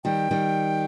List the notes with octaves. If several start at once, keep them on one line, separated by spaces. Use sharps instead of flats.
D#3 G3 G5
D#3 G3